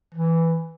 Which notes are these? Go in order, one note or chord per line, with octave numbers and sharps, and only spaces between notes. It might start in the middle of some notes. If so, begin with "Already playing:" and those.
E3